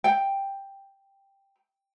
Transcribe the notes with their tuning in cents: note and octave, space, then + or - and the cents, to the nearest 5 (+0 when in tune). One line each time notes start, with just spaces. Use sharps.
G5 +5